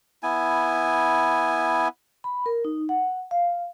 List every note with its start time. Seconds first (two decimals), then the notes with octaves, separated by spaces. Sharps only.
0.23 B3 E4 G#5
2.24 B5
2.46 A#4
2.65 D#4
2.89 F#5
3.31 F5